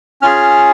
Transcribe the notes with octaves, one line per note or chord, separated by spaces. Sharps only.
C#4 F4 G#4 F6